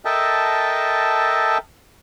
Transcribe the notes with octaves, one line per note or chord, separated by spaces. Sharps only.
A4 A#4 D#5 E5 G5 A5